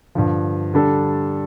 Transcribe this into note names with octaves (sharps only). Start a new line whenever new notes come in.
G2 D3 F3
D3 G3 D4 A4